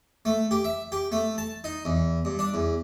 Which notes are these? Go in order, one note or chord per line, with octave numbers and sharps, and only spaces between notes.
A3
G4
E5
G4
A3
A5
D#4
E2
G2
D4
E2